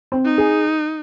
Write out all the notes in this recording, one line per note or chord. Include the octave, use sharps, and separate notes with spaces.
C4
D#4
G#4